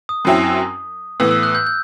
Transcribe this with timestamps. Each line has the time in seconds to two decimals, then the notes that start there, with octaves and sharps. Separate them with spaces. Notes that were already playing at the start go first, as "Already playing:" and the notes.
0.09 D#6
0.25 F#2 F#3 C4 E4
1.20 A2 E3 B3 E6
1.31 E6
1.43 F#6
1.55 G6
1.67 G6